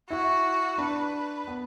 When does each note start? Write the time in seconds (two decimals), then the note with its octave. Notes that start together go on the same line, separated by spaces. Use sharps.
0.10 E4 F#4
0.78 D4 B4
1.48 B3